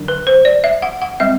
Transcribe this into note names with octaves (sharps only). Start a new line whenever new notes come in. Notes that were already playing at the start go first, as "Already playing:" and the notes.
Already playing: D3 F#3 D4
B4
C5
D5
E5
F#5
F#5
G3 C4 E5